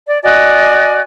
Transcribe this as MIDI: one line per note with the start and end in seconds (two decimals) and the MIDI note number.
0.08 0.18 74
0.23 1.00 66
0.23 1.00 74
0.23 1.00 75
0.23 1.00 80